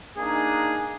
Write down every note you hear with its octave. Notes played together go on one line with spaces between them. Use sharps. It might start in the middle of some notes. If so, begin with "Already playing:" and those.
A#3 D4 D#4 G#4